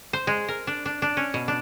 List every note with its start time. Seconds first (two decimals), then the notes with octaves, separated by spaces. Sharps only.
0.13 C5
0.27 G#3
0.48 A#4
0.67 D4
0.86 D4
1.02 D4
1.17 C#4
1.34 B2
1.48 D4